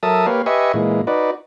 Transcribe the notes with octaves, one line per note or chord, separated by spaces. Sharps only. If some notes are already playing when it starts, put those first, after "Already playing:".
F#3 A4 A#4 E5 A5 D#6
A#3 G4 B4 C#5 F5
G4 B4 D#5 E5 G#5 C#6
A#2 E3 G#3
D#4 F#4 B4 D5